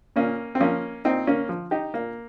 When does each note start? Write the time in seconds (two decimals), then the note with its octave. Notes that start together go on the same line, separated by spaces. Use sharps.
0.16 A#2 A#3 C#4
0.55 C4
0.60 F3 A#3 C#4
1.05 A#2 C4 D#4
1.27 A#3 C#4
1.49 F3
1.71 D#4 G4
1.94 A#2 A#3